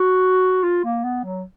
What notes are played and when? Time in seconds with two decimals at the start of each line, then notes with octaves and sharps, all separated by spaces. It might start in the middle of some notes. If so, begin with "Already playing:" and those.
Already playing: F#4
0.63 F4
0.84 A#3
1.04 B3
1.24 F#3